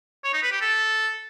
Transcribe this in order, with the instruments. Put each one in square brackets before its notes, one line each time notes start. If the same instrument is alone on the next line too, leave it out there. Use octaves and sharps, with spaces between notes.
[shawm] C#5
D#4
B4
G4
A4